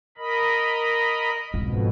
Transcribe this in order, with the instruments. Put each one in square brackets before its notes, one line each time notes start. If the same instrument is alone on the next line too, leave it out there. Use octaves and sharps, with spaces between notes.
[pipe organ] A#4 D#5 B5
[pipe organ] F2 B2 [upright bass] G#2